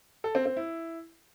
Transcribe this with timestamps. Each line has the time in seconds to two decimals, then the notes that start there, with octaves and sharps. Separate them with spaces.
0.24 A4
0.35 C4
0.46 C4
0.57 E4